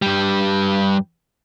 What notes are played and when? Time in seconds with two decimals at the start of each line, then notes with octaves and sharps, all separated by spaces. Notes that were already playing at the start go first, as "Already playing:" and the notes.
0.02 G2 G3